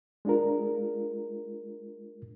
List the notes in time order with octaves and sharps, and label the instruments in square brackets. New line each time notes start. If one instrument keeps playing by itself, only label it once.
[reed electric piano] G#3 D4 F4 A#4